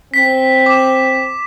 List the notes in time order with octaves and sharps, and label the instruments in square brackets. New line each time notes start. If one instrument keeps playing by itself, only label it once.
[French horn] C4 [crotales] B6
[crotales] D6 E7